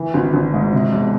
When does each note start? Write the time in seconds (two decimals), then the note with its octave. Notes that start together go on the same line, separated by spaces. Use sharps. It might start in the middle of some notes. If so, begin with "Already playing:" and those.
Already playing: E3
0.14 G#1
0.34 G#1
0.54 G#2
0.73 C3
0.92 E1